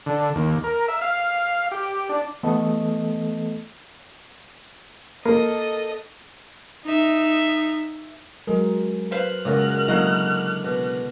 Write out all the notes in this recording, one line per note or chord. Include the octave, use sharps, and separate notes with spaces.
D3
D#2
A#4
E5
F5
G4
D4
E3 A3 B3 A4 D#5
A#3 A4 D#5
D#4 E5
F#3 G#3 A#4
B4 C5 F5 F6 F#6
F#2 A#2 C#3 F#3 G#3
D3 F#3 A#3 E4 F#4 A#4 D#5
B2